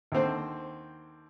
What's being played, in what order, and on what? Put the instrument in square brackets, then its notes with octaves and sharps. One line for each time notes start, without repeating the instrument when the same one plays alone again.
[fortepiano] D#2 D3 C4 C5